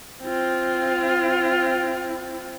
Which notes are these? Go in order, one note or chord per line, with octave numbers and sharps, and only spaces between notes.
C4 F4